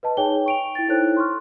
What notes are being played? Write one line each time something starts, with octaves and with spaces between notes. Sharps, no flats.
B4 D#5 A5
D#4 G#4 C#5 G5 G#5 G7
C#6 D7 F7
E4 G5 A6
D#4 E4 A4 C5 C#5 F#6
C6 C#6 F6